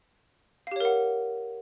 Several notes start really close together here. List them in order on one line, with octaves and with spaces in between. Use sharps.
F5 G4 C#5 A#4 F#5